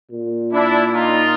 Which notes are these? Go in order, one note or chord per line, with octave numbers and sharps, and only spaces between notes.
A#2
D4 E4
D#4 F4